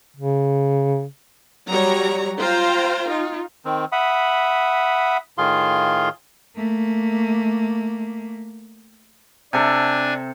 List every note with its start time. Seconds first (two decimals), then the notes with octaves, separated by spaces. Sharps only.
0.16 C#3
1.69 F#3 G3 C#5 A#5
2.39 F4 C5 F5 G5 A#5
3.08 D#4 F4
3.65 D#3 C4
3.92 E5 F#5 B5 D#6
5.38 A2 D#3 F4 G#4 F5 C6
6.57 A3 A#3
9.53 C3 D4 A4 G#5